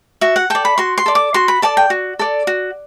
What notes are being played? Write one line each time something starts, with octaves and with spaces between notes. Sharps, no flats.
F#4 E5
F#5
A4 D5 G5
B5
F#4 C6
C6
A4 D5
D6
F#4 C6
B5
A4 D5 A5
G5
F#4
A4 D5
F#4